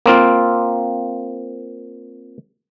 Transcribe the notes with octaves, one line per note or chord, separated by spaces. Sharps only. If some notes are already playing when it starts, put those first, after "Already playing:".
A#3 C4 F4